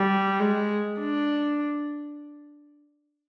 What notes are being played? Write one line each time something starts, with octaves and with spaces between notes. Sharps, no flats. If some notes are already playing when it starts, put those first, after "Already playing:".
Already playing: G3
G#3
D4